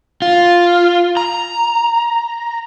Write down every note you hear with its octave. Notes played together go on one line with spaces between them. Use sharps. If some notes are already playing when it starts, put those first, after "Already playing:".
F4
A#5